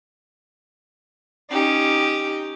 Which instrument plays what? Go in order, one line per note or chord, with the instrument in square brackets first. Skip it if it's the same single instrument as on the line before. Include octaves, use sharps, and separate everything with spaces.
[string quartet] C#4 D#4 G4